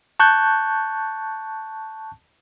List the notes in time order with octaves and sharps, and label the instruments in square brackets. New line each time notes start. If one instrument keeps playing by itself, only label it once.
[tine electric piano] A5 C#6 F#6 G6